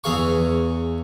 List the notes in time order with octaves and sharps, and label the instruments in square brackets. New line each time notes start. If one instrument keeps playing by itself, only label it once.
[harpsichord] E2 E3 G#4 F5 C#6